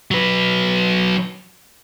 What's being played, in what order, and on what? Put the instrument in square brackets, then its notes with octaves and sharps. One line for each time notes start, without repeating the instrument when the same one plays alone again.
[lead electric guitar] F#3 B4